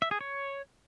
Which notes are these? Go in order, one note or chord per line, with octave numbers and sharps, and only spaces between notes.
E5
G#4
C#5